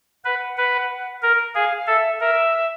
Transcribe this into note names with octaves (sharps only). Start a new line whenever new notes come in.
B4 F#5
B4
A#4
G#4 F5
F5
A4 E5
A#4 E5